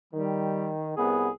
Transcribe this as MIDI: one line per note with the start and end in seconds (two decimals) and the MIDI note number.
0.13 0.95 51
0.13 0.73 55
0.97 1.28 36
0.97 1.28 59
0.97 1.30 68